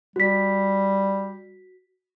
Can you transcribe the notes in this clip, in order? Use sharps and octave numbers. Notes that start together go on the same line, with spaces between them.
G3 F#4 B6